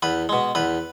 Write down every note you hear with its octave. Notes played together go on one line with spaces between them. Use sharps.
E2 B4
B2 G#3
E2 B4